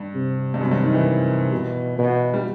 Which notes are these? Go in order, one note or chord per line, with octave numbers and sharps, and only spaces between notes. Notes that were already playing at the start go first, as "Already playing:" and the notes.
Already playing: G2
C3
G2
F#2 C3
G2
D#3
E3
B2
B2
G3